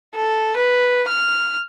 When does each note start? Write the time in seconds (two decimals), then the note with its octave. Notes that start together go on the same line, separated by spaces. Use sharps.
0.15 A4
0.56 B4
1.08 F6